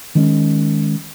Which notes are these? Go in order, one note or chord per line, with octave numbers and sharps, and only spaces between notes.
D#3 G#3 C#4